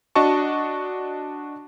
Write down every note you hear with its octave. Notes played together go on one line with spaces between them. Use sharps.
D4 F#4 D#5 A5 C#6